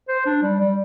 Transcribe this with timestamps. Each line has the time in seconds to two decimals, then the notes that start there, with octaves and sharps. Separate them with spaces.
0.09 C5
0.26 D4
0.43 G3
0.60 G3